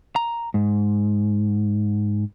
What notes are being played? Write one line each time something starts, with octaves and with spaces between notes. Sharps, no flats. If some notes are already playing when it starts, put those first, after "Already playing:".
A#5
G#2